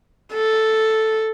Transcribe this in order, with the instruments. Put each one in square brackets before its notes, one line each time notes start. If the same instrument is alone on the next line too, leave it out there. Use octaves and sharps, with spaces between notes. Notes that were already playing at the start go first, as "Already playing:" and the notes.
[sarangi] A4